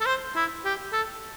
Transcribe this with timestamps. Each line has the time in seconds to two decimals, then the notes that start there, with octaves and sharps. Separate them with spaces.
0.01 A4
0.06 C5
0.36 E4
0.65 G4
0.93 A4